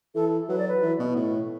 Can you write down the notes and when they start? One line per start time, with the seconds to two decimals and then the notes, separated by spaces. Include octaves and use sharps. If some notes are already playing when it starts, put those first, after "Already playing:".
0.15 E3 A4
0.49 F#3 B4
0.58 D5
0.68 B4
0.82 E3
0.99 B2
1.16 A2